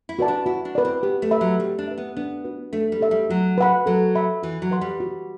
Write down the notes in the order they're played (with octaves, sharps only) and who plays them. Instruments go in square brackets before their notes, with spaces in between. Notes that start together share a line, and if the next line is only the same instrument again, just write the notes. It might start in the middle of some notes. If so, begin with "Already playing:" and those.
[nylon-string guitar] E4
[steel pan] F#4 B4 D5 A5
[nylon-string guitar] D4
[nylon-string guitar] E4 [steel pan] F#4
[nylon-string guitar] D4
[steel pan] B4 D5
[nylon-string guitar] C4
[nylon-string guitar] B3 [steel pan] G4
[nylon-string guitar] A3
[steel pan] B4 E5 B5
[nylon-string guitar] F#3
[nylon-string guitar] G3 [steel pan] G4
[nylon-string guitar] D4
[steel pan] B4 E5
[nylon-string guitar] B3
[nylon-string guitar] B3 [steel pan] D4
[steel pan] F#4 B4
[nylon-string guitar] A3 [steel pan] D4
[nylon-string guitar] G3
[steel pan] A4 E5
[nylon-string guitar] G3
[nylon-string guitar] F#3 [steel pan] F#4
[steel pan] B4 F#5 B5
[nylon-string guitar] F#3 [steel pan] A4
[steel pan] E5 B5
[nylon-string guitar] E3 [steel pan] F#4
[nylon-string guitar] F#3
[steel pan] B4 F#5 C6
[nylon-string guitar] G3
[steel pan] F#4